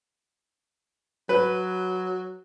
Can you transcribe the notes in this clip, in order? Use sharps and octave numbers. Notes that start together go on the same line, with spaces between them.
F#3 B4